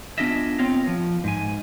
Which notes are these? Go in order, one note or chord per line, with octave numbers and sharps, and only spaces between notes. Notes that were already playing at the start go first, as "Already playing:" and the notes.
B3 D4 F4 G#4 D#5 E5
B3 C4 F4 C#5 D#5 F5
F3
G#2 G#5